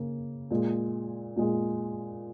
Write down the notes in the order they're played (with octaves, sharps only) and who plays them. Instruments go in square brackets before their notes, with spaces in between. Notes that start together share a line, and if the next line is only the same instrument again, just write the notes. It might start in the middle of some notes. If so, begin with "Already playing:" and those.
Already playing: [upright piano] C#3 A#3
A#2 G#3
A#2 G#3